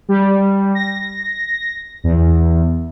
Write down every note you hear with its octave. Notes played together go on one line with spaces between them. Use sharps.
G3
A#6
E2